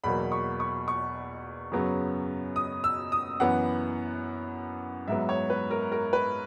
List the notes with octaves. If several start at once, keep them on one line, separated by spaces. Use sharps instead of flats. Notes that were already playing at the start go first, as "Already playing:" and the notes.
E2 B2 F#3 A#3 B5
C#6
C#6
C#6
F#2 C#3 F#3 B3
D#6
E6
D#6
F#2 E3 B3 F#5
G#2 F#3 B3 E5
C#5
B4
A#4
A#4
B4